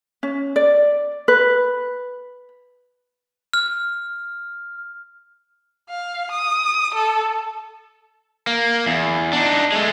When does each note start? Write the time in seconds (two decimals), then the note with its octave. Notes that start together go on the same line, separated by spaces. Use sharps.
0.23 C#4
0.56 D5
1.28 B4
3.54 F6
5.90 F5
6.31 D#6
6.94 A4
8.47 A#3
8.86 E2
9.33 D4 D#4
9.72 G#3 A3